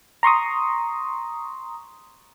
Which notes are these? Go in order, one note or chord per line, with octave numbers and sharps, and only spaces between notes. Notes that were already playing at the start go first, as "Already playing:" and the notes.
A#5 C6 C#6 D#6